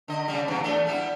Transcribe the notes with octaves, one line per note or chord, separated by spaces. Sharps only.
D3 D#5
C#3 G3
E2 G2 B2
E2 A3 D4
G3 B3 E4